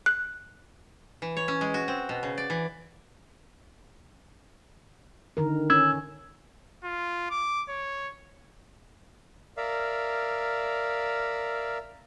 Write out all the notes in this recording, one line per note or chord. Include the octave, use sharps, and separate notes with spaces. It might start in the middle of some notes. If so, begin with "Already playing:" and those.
F#6
E3
C#5
C#4
G#3
F#4
C4
B2
C#3
D5
E3
D3 D#3 A#4
C#4 E6 G#6
F4
D6
C#5
A#4 D5 E5 F5